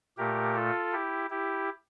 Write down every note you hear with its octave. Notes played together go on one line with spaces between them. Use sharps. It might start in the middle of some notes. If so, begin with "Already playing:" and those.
A#2 A3 G4 A#4
F4 A4
E4 G4
E4 G4